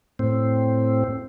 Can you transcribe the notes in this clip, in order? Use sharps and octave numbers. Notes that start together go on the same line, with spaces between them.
A2 C4